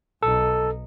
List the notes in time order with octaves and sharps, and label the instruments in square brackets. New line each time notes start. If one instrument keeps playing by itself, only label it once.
[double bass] B1 D#4 [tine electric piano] A4